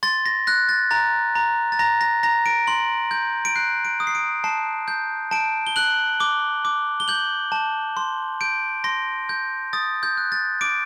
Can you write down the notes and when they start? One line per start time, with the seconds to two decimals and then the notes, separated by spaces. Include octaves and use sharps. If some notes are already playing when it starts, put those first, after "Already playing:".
0.03 C6 A6
0.26 A#6
0.47 F#6 A#6
0.69 A6
0.91 A#5 A6
1.35 A#5
1.72 A6
1.79 A#5 A#6
2.01 A#6
2.23 A#5 A#6
2.46 D7
2.67 C6 F#7
3.11 G6
3.45 D7
3.56 F#6 C7
3.85 D7
4.00 D#6
4.07 C7
4.15 D7
4.44 A5 C7
4.88 G6
5.31 A5 D7
5.67 G7
5.76 F#6 F#7
6.20 D6 G7
6.65 D6
7.00 G7
7.08 G6 F#7
7.52 A5
7.97 C6
8.41 G6 D7
8.84 C6 A#6
9.29 G6
9.73 D#6 A6
10.03 G6
10.17 F#6
10.32 A6
10.61 D6 D7